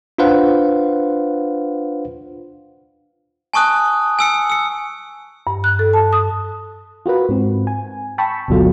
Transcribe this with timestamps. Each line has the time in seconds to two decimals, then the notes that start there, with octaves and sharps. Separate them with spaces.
0.18 D4 F4 B4 C5 F5 F#5
3.53 G#5 A5 C#6 D#6 F#6
4.19 G#5 E6 C#7
4.50 E6 C#7
5.47 G2
5.64 F#6
5.79 A4
5.93 A5
6.13 D#6
7.06 F4 F#4 A#4 B4
7.29 G#2 C4
7.67 G#5
8.18 G5 A5 B5 C#6 E6
8.48 G1 D2 B2 F#3 F4 A4